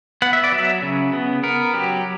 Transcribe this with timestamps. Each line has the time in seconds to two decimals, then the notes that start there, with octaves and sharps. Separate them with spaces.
0.22 B3 F#5
0.33 E5
0.44 D5
0.52 F#3 E5
0.82 C#3
1.13 B3
1.43 B3 A#4
1.74 F#3 G4